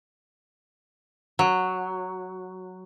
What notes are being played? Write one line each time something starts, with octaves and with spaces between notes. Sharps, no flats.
F#3